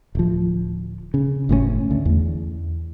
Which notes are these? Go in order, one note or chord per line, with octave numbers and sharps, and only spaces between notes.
D1 F3
C#3
G1 A2 C#3 C#4
D2
E2